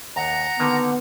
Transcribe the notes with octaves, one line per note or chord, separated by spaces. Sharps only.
D#2 F#5 A#5
D3 D#3 A#3 B3